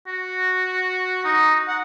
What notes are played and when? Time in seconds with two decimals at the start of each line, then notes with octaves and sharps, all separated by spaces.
0.07 F#4
1.25 D#4
1.68 F#5